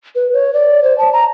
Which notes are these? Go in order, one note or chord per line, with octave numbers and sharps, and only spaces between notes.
B4
C#5
D5
C5
A5
A#5